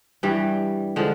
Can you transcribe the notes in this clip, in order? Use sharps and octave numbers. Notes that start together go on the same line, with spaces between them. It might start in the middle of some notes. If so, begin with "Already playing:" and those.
G2 E3 G3
D3 F3 G#3